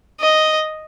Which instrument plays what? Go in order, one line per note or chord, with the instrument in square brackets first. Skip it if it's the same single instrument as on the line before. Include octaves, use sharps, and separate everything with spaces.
[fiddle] D#5